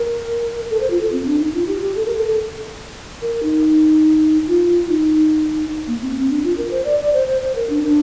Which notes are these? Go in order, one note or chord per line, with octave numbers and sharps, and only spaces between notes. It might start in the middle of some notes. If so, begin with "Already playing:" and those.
Already playing: A#4
A4
C5
F4
A4
C4
D4
D#4
F4
G4
G4
A4
A#4
A4
A4
A#4
D#4
F4
D#4
A#3
C4
C4
D4
F4
A#4
C5
D5
D5
C5
C5
C5
A#4
D4
D4